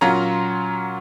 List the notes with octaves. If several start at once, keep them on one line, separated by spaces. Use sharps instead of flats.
A#2 F#3 C#4 F4 A#5